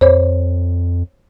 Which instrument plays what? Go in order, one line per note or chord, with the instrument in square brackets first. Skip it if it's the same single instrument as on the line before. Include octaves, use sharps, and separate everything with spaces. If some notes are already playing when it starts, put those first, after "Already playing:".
[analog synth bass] F2 [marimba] C5 C#5